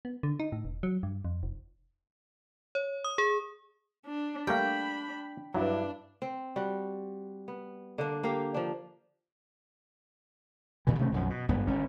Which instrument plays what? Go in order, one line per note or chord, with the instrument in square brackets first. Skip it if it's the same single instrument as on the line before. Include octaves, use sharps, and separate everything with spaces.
[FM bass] B3
D3
D#4
A2
E1
F#3
G2
F2
F1
[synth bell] C#5
D#6
G#4
[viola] D4
[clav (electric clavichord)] G3 A3 A#3 [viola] D4 B5 [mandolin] G5
[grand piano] G2 E4 B4 [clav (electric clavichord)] F#3 [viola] D4
[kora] C4
G3 F#4
B3
D3 A#3 D4
A#3 G4 F5
F3 D4
[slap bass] A#2 D#3 E3
C3 D#3 A3 C#4
B1 F#2 F3
B2
G#1 G2 B3
G1 C#4